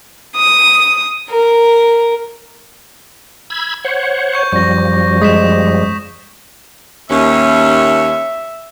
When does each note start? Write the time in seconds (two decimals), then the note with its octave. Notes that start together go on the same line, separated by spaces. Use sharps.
0.36 D#6
1.31 A#4
3.50 B5 E6 G#6
3.84 C5 C#5 F#5
4.34 C#6 G6
4.52 F#2 F3 G3 C#6 A#6
5.22 G#3 D#6 B6 E7
7.11 D#2 C#4 E5